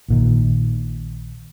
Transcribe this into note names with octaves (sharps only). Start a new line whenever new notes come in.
A#1 A#2 D#3